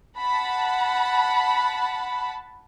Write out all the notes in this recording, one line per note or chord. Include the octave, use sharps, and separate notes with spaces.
F#5 A5 B5